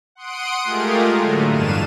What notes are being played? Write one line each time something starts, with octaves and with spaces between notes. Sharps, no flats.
F#5 C6 D#6 D7
G#3 A3 F4 G4 G#4 A#4
A2 D3 F#3 A3 A#3
E2 G2 D4 F5 D#7 E7